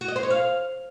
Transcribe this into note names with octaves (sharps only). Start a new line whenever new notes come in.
F#4
D#5
C5
C#5
F5